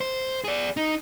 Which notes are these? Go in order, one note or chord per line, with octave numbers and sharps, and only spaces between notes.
C5
G#4 D5
D#4